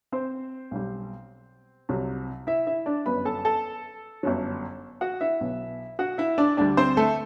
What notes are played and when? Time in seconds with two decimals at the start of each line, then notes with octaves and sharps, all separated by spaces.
0.12 C4 C5
0.71 B1 B2 G3
1.89 C2 C3 F#3
2.47 E4 E5
2.67 E4 E5
2.86 D4 D5
3.06 G1 F#2 F#3 B3 B4 B5
3.25 A4 A5
3.45 A4 A5
4.23 G1 F#2 F#3
5.01 F#4 F#5
5.21 E4 E5
5.41 B1 B2 F#3 B3
5.99 F#4 F#5
6.18 E4 E5
6.38 D4 D5
6.57 D2 D3 G3 D4 D5
6.77 C4 C5
6.97 A3 A4